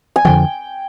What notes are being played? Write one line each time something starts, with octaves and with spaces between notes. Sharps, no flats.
G#5
F2 D3 F3 G5